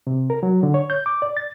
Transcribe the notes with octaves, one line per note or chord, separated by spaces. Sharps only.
C3
A#4
F#3
D3
C#5
G6
D6
D5
A6